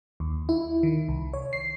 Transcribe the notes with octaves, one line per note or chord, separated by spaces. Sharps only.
D#2
E4
D#3
C2
C#5
C7